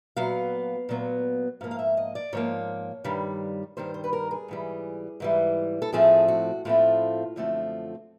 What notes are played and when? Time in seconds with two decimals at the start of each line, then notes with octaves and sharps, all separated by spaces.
0.16 A#2 F#3 B3 F5
0.89 A#2 F#3 B3
1.61 G#2 F3 A#3 F5
1.71 F5
1.79 E5
1.97 D#5
2.15 D5
2.33 G#2 F3 A#3 C#5
3.04 G2 D#3 G3
3.77 G2 D#3 G3 C5
3.94 C5
4.04 B4
4.13 A#4
4.31 G#4
4.48 G#2 E3 G3
5.20 G#2 E3 G3
5.82 A4
5.92 A2 F3 A3 C4 G#4
6.28 F#4
6.65 A2 F3 A3 C4 F4
7.36 F#2 D3 F3 A3 C4